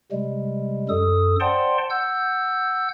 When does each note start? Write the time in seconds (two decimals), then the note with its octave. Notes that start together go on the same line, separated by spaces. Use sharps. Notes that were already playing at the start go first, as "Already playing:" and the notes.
0.12 C3 G3 G#3
0.89 F#2 A4 D#6
1.40 C5 D5 F#5 G5 A5 C6
1.90 F#5 E6 G6